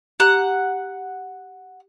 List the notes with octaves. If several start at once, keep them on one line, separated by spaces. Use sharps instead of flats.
G4 F#5 A#5 G6